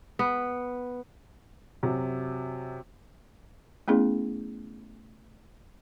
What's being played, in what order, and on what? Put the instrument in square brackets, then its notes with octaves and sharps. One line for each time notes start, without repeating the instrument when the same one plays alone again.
[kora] B3
[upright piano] F#2 C3 F#3
[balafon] A3 B3 C#4 E4 G#4